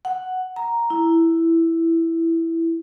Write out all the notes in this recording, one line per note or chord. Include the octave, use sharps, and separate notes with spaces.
F#5
A#5
E4